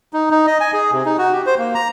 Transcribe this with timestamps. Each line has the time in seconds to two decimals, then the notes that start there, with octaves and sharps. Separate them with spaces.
0.13 D#4
0.31 D#4
0.47 D#5
0.60 G#5
0.73 G#4
0.92 C3
1.05 D#4
1.18 F#4
1.32 G4
1.46 C5
1.58 A#3
1.75 A#5